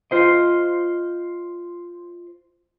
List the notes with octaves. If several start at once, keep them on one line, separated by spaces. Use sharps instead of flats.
F4 C5 D#5